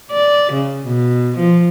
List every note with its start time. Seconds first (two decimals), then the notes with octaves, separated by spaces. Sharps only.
0.11 D5
0.52 C#3
0.87 B2
1.37 F3